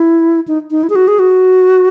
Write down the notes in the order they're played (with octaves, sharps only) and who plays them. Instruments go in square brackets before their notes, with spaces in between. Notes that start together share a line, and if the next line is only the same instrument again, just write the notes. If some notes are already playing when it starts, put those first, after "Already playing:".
Already playing: [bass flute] E4
D#4
D#4
E4
G#4
F#4
G#4
F#4